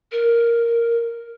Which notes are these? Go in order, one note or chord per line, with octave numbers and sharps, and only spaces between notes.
A#4